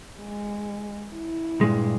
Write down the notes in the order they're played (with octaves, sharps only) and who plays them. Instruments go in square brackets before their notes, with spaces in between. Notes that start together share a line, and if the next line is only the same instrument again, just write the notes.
[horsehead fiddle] G#3
E4
[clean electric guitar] G2 A#2 G#3